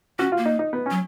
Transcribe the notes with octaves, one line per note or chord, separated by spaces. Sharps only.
C#4 F#4
F4
A#3
D#4
D#4
B3
C#4
F#3